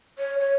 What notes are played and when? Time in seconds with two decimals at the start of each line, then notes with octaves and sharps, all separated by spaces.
0.19 C#5
0.40 C#5